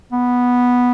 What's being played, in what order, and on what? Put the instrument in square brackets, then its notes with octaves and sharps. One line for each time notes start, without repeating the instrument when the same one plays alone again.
[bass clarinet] B3